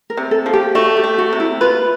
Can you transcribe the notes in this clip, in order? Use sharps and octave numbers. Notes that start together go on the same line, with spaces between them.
A#4
C3
A4
F3
G4
A3 F#4
G4
A3
F#4
C3
E4
F4 B4